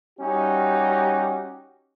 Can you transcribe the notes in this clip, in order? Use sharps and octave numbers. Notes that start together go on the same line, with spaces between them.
G3 C#4 D#4 F#4 G4